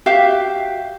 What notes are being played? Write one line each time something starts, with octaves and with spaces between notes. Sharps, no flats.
F#4 G4 E5 F5